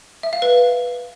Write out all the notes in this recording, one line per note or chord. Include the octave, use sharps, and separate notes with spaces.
E5
F5
B4